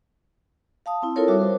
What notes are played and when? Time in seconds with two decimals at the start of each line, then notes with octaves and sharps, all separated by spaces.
0.86 F5 A5 D#6
1.02 C4 E4
1.16 E4 F4 A4 A#4 C#5
1.28 G3 F#4 E5 D6
1.42 C5